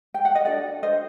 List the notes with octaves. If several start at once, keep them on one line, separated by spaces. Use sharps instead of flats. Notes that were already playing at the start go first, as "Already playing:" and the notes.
G5
F#5
D#5
D4 F#4 A4 D5
D4 F#4 A4 C5 D#5